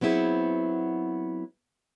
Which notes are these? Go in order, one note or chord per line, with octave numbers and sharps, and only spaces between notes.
F#3 B3 C4 E4 G#4